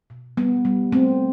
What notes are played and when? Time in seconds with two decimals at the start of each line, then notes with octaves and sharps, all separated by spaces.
0.10 B2
0.37 G3 B3
0.65 G3
0.92 A3 C4